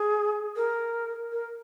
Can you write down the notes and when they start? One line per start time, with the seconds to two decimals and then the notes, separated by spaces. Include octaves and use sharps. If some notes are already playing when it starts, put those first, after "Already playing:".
Already playing: G#4
0.56 A#4
1.32 A#4